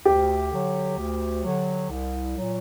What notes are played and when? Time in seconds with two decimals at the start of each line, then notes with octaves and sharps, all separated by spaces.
0.05 D2 G4
0.51 D3 F#3
0.97 D2
1.44 D3 F#3
1.90 C2
2.36 A#2 F#3